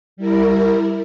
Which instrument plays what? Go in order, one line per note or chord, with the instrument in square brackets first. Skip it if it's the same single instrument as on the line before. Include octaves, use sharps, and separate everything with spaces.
[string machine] G3 E4 A#4